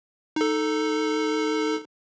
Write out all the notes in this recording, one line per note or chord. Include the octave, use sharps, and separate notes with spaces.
D#4 A4